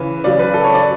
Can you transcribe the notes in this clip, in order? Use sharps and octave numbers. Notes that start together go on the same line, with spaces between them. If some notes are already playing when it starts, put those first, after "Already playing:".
Already playing: C#3 E3 B4
C#3 F#3 D5
B4
A4
C#5
D5